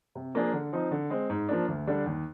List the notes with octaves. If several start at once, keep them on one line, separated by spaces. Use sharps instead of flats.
C3
F3 A#3 D4 G#4
D3
F3 C4 D#4
D3
G#3 C4
G#2
F3 A#3 D4
D2
D3 G3 D4
D#2